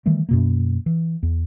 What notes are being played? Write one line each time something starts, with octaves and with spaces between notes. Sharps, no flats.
D#3 E3 G3 A3
F#2 B2 A#3
E3
E2